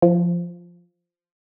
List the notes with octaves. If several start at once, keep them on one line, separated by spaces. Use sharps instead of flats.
F3